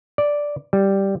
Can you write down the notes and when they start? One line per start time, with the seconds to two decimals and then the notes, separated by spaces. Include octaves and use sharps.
0.18 D5
0.73 G3